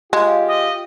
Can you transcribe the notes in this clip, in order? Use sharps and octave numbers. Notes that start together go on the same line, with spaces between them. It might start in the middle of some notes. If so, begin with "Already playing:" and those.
G#3 F4 G4
D#5